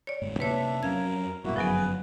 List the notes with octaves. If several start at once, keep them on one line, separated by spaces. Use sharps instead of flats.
C#5 D5
G1 G#2
F2 C3 A#3 D4 B4 C#5 E5
F2 F#3 C#4 A#4 F5 G#6
F1 G2 B2 A#3 E4 F#4
G1 F#2 F3 F#3 B3 G#4 B4